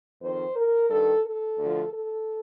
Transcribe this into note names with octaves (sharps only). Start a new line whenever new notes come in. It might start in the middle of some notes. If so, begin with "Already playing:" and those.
F2 D#3 C5
A#4
G2 D#3 A4
A4
D2 D3 F3
A4